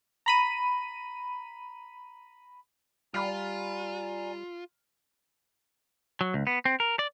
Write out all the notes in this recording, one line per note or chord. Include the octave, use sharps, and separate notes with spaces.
A#5 B5 D#7
G3 F4 D5 G#5 A#5 B5 F6
F#3
C#2
B3
C4
A#4
D5